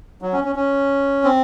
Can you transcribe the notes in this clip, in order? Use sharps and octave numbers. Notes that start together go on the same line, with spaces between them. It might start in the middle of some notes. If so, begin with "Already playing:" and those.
F#3
C#4
C#4
C#4
C4